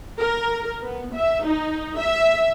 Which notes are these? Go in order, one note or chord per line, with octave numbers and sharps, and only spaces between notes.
A#4
B3
E5
D#4
E5